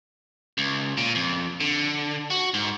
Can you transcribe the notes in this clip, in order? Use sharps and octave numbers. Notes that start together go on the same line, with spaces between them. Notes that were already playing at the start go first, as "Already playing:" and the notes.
C#2
A#2
F2
D3
F#4
G#2